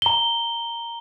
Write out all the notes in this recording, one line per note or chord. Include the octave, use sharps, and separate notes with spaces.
A#5 G7